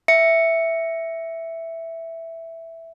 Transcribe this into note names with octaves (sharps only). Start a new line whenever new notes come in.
E5 C#7